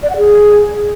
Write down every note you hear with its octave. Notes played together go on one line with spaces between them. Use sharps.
D5
F#5
G#4